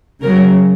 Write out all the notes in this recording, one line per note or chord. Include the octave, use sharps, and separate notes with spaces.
C#3 F#3 A#4